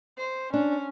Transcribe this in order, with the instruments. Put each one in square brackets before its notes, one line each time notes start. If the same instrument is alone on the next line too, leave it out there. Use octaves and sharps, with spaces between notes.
[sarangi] C5
[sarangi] C#4 [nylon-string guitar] D4